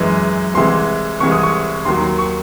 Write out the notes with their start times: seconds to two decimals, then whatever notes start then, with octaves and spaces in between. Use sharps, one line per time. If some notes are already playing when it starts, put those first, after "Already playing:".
Already playing: F#2 E3 G#3
0.55 C2 C3 E3 G#3 C6
1.20 C2 C3 E3 G#3 C#6
1.32 D#6
1.43 C#6
1.85 D#2 D#3 F#3 C6
2.02 C6
2.19 C#6